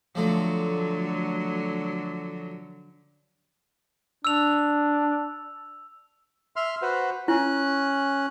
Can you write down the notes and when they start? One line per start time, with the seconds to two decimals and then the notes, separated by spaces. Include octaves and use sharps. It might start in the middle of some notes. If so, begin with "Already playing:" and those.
0.15 D3 F3 F#3 A3
4.25 D4 E6 F7
6.56 E5 C6 F6
6.82 F#4 B4 C5
7.28 C#4 E4 F#6